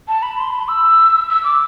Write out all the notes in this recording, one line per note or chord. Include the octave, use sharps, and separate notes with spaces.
A5
B5
C6
B5
E6
E6
D6